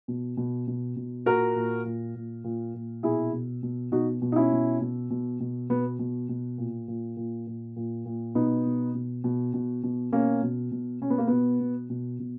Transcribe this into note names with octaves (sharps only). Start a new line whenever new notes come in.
B2
B2
B2
B2
A#2 F#4 A#4
A#2
A#2
A#2
A#2
A#2
B2 E4 G#4
B2
B2
B2 D#4 F#4
B2
D#4
C#4 E4
B2
B2
B2
B2
B2 B3
B2
B2
A#2
A#2
A#2
A#2
A#2
A#2
B2 B3 D#4
B2
B2
B2
B2
B2
B2 A#3 C#4
B2
B2
B2 C#4
B3
A#3
B2 B3
B2
B2
B2